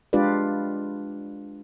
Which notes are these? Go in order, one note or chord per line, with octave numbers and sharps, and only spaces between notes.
G#3 D4 F4 G4 B4 D5